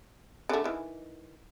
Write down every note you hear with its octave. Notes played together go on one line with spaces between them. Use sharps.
D3 A3
D#3 E3